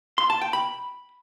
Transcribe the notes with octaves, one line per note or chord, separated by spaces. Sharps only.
C6
A5
G5
B5